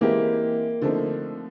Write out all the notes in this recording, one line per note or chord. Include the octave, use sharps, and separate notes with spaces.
E3 G#3 A#3 C4 E4 G4
D3 F3 A3 C4 D#4